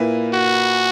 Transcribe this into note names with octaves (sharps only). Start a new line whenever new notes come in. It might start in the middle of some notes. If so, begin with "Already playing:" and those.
Already playing: A#2 A#3 E4 B4
F#4